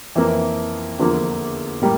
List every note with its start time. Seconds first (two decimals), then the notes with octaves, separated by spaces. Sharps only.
0.15 F2 E3 A#3
0.99 E2 D3 F3 A#3
1.81 A2 G3 A#3